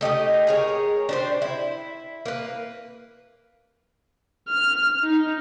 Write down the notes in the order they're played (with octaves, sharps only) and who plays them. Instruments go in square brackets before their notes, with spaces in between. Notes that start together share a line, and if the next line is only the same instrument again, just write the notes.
[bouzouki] A3 D#4 G4 D#5
G#4 A#4 C#5
D4 G4 C5
E4
A#3 B4
[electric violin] F6
D#4